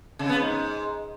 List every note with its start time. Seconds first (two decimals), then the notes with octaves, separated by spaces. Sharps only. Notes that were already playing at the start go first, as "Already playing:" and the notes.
0.19 C#3
0.29 B3
0.39 G#2